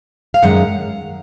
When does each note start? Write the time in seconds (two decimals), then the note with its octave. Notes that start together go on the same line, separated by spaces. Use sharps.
0.34 F5
0.43 F#2 D#3 G#3 F#5